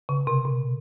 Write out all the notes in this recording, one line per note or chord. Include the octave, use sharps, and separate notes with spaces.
C#3
C3
B2